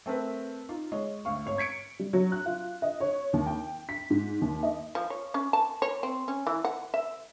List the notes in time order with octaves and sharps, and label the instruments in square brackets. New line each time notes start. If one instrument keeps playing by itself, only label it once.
[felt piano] A3 C4 A#4 B4
D#4 F4
G#3 C#5 D#5
D2 F5 C#6
G#1 C#5
C#6 G#6 B6 C#7 D7
[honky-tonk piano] G3
F#3
F#6
F4
D#5
C#5
D#2
G5
B6
G#2
D#2
D#5
[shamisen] F3
C#5
C#4
A5
C#5
C4
C#4
E3
F#5
E5